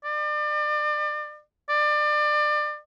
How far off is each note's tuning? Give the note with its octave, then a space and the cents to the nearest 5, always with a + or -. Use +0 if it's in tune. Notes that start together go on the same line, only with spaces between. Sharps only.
D5 +35
D5 +30